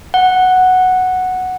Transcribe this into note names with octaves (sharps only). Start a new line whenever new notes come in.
F#5